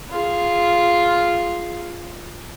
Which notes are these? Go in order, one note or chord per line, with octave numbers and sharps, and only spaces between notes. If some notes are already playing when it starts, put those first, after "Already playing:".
F4 G#4